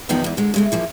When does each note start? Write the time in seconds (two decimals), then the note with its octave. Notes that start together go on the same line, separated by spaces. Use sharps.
0.09 E2 D#3 F3 B3 D#4
0.24 E2 G#2
0.37 D3 G#3
0.54 C#3 G#3 A3
0.72 E3 F3 A#3